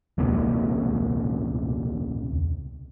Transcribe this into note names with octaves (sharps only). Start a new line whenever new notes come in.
E1 C#2 C3 A#3